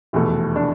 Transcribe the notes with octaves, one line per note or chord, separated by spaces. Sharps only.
F1 E2 B2 A3
D4